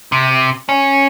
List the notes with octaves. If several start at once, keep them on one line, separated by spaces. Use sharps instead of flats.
C3
C#4